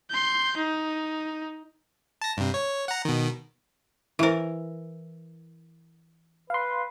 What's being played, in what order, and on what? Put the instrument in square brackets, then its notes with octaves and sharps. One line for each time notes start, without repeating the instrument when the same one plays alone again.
[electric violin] C6 G6
D#4
[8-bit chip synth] A5 A#6
G2 C3
C#5
F#5 A#5
B2 D#3
[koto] E3 A#4 [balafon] E4 C5
[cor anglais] B4 [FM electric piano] F5 C6